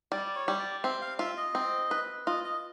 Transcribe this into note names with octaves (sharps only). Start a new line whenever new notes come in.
G3 D5
D5
C#5
G3
D5
C4 E5
F5
F4 E5
D#5
C4
B4
F4 D#5
D#5